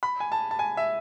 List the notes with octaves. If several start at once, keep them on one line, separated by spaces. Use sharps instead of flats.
B5
G#5
A5
A5
G#5
E5